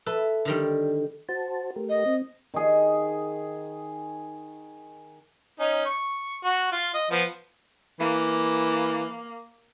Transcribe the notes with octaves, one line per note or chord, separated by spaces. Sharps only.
A4 B4 E5
D3 D#3 G3
F#4 C5 A5
A3 G4 A#4
D#5
C4
D#3 G#4
C#4 D#4
C#6
F#4
F4
D#5
F3 B3
E3 A#3